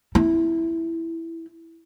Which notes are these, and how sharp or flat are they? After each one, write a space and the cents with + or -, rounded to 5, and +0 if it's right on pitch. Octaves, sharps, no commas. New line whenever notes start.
C4 -25 E4 +0